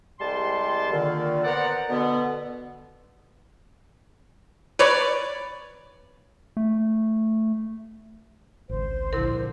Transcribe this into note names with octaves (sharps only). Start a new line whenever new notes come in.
C2 G3 G#3 A5 C6
A#2 D3 D#3
B3 A#4 C5 D5 F#5
B2 D3 B3
B4 C#5 D5
A3
G#1 C#2 C5
A#1 D3 E4 A#4